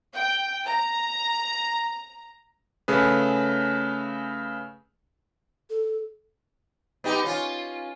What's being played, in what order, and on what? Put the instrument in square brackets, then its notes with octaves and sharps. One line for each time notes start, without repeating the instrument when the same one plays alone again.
[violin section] G5
A#5
[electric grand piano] C#3 A3 G#4 B4
[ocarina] A4
[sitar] B3 D#4 G4
C#4 F4